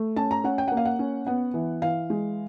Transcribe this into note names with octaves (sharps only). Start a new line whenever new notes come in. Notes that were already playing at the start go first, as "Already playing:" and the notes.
Already playing: A3
C#4 A5
A#5
C#4 F#5
G5
A#3 F#5
F5
F#5
C#4
B3 F#5
E3
E3 F5
G#3